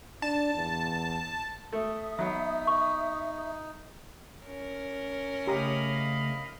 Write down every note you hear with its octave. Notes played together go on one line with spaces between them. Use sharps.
D4 A5
E2
A3 E5 D#6
F#3 B3 D#4
C#6
C#4 A#4
C#3 A3 G4 D#5 F5 A#5 B5